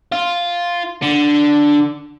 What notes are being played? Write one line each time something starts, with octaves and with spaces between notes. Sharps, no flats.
F4
D3